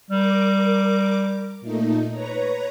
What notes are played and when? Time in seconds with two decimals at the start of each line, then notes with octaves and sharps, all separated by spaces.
0.11 G3 A#4 D6
1.61 A#2 A3 D#4
2.12 B4 C#5 A#5